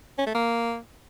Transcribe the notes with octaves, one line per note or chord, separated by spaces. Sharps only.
C#4
A3
A#3